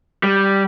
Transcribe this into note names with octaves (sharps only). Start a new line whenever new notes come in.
G3